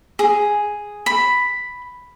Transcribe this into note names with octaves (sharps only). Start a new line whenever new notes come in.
G#4
B5